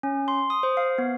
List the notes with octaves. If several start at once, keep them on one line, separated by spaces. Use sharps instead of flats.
C#4
C6
D#6
C5
F5
B3